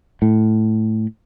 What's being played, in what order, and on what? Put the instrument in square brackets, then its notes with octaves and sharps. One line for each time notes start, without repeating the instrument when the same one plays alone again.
[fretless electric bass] A2